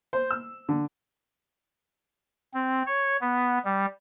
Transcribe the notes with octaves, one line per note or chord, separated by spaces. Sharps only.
C5
E6
D3
C4
C#5
B3
G3